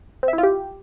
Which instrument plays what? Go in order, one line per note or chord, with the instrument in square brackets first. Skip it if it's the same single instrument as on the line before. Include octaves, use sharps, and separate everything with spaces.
[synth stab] C4
E5
E4
F4
G4